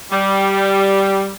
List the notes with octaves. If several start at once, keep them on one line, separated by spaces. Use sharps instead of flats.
G3